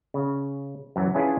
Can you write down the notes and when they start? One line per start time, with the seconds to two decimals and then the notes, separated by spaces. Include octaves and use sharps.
0.14 C#3
0.96 F#2 E3 F#3
1.15 C#4 D4 E4 F4 G#4 B4